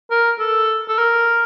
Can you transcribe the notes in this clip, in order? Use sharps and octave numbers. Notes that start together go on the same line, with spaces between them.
A#4
A4
A4
A#4